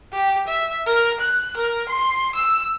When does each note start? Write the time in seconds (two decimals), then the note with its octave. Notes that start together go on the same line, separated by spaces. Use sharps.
0.13 G4
0.47 E5
0.86 A#4
1.20 F#6
1.57 A#4
1.89 C6
2.35 E6